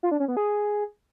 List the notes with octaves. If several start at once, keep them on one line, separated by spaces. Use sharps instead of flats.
F4
D4
C#4
B3
G#4